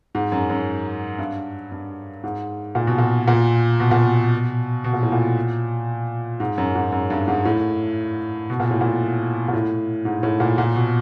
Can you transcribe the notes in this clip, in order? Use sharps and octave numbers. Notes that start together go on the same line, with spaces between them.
G#2
F#2
F#2
G2
G2
G#2
A#2
B2
A#2
A#2
B2
A#2
B2
B2
A#2
A2
A#2
G#2
F#2
G#2
F#2
G2
G#2
A2
B2
A#2
A2
A#2
A#2
A2
G#2
A2
A#2
A#2
B2